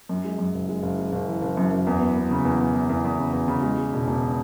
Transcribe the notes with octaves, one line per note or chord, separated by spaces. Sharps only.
F#2
G#3
F#2
F#1
G#3
F#1
G#3
F#1
E3
F#1
F#2
F#2
E2
B3
B3
C#3
E2
E2
E2
E2
E2
C#3
E2
C#3
G#3
G#3
E1
E1